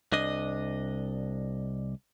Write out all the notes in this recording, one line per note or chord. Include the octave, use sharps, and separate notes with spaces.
C2 D4 D#5